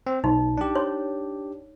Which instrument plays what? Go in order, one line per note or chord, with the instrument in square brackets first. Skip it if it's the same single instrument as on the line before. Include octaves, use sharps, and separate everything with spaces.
[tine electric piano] C4
[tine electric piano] B1 [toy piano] D#4
[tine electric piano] D4 G4
[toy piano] C#5